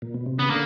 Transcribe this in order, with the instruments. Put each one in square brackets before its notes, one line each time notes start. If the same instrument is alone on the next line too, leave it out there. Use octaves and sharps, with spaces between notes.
[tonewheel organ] A#2
B2
C3
[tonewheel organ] C#3 [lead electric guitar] B3
[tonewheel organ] D3 [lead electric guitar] A#3